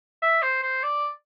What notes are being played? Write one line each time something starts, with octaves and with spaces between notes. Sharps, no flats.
E5
C5
C5
D5